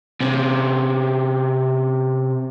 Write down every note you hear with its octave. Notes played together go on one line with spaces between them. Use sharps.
C3 C#4